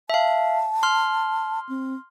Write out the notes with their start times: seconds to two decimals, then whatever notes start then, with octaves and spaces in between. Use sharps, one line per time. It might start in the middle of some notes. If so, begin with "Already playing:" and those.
0.10 E5 F5 A5
0.83 C6 F6
1.69 C4